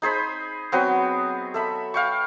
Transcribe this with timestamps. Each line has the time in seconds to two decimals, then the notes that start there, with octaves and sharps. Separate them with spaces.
0.02 D#4 G#4 C5 B5
0.72 F#3 B3 C4
1.54 A4 E5 B5
1.94 F5 G5 C#6